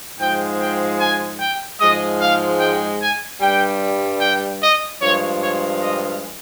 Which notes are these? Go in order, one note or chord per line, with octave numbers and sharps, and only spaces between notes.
G#2 F3 G#3 G5
G5
G#5
G5
G#2 F3 G#3 D#5
F5
G5
G#5
G2 G3 G5
G5
D#5
G2 F3 G#3 C#5
C#5
D#5